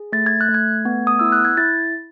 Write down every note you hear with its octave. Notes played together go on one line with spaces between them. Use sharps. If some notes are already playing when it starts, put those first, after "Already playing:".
Already playing: G#4
A3 A6
G#6
F#6
A3
G#6
B3
D#6
E4 E6
F#6
G#6
E4 A6